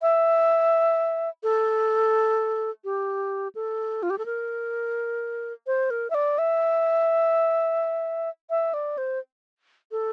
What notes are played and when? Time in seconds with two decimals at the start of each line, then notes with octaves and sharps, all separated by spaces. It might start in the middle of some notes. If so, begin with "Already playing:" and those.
0.02 E5
1.43 A4
2.84 G4
3.55 A4
4.03 F4
4.10 G4
4.18 A4
4.26 A#4
5.67 C5
5.90 A#4
6.10 E5
6.15 D5
6.38 E5
8.50 E5
8.74 D5
8.98 C5
9.92 A4